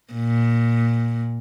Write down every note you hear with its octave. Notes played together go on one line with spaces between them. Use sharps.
A#2